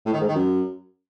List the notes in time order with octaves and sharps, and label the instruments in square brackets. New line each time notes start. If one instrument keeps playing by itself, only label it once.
[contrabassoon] A2
D#3
G#2
D#3
F#2